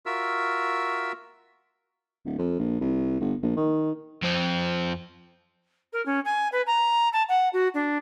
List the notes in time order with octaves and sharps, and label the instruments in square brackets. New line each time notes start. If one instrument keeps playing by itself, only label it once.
[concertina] F4 F#4 A#4 E5 E6
[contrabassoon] D1
F2
A#1
C2
G1
A#1
D#3
[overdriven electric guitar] F2 C4
[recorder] A#4
C#4
G#5
B4
A#5
A5
F#5
F#4
D4